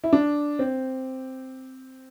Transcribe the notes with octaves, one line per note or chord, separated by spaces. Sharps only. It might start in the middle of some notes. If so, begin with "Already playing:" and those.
E4
D4
C4